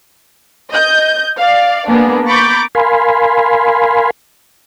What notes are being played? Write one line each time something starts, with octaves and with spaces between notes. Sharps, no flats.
D#5 G6
D5 F5
A#3 B3 D4 G#4
A#5 B5 C#6 D6 G6 A6
A#4 F5 G#5 B5 C6